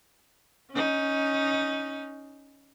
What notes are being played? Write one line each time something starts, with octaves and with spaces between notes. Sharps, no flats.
C#4 D#4